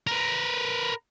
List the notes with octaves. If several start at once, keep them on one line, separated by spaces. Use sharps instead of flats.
A#4 B4